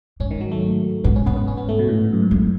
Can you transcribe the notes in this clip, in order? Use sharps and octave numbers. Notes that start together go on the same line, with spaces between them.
G#2 C#4
D#3
F#3
A3
G#2 B3
C#4
G#2 B3
B3
C#4
B3
A3
B2
A2
F#2
G#2
F#2 A2